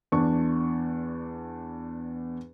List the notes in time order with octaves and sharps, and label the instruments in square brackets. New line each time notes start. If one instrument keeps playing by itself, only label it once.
[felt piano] E2 D4 C#6